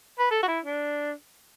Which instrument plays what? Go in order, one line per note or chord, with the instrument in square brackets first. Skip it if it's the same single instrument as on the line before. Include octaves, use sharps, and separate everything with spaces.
[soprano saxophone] B4
A4
F#4
E4
D4